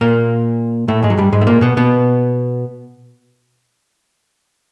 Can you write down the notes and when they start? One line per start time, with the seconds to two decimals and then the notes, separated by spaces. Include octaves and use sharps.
0.01 A#2 A#3
0.88 A2 A3
1.03 G#2 G#3
1.10 F#3
1.17 G2 G3
1.32 G#2 G#3
1.41 A3
1.47 A#2 A#3
1.61 B2 B3
1.77 B2 B3